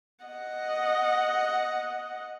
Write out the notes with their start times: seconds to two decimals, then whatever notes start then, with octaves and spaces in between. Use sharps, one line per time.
0.25 D#5 F#5